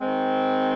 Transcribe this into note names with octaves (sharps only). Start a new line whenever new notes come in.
D#3 G#3 C4